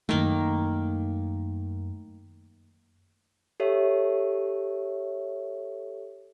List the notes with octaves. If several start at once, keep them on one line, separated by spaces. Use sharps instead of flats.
F#2 D#3 A3 A#3
G4 A4 C#5 E5